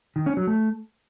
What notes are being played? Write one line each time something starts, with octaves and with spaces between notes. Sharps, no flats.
D#3
C#4
F#3
A3